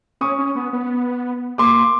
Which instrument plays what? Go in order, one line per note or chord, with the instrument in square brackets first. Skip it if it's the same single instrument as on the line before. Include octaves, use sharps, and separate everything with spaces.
[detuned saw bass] C#4 [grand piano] C#6 D#6
[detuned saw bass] C#4
B3
B3
[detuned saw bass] A#3 [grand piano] C6 D6